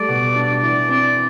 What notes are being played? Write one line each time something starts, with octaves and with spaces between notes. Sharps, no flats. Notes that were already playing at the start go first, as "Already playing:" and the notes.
Already playing: G3 A3 D5
B2
D4
E3 D5
C4 D5